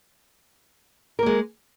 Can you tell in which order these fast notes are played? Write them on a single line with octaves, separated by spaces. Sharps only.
A#4 A#3 G#3